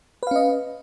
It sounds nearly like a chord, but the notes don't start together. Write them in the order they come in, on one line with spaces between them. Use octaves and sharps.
B4 F5 C#4 D#5